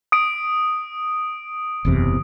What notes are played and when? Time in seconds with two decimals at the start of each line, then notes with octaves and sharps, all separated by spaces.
0.12 D#6 D7
1.85 F#1 E2 C3